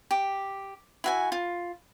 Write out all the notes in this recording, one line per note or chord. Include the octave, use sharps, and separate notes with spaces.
G4
E4 F#4 G#5
F4